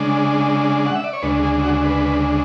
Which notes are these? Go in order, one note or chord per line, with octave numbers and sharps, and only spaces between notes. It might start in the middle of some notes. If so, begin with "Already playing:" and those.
Already playing: C#3 G#3 D4
F#5
E5
D5
C#5
D2 C#3 G#3 D4 B4
G#4
F#4
B4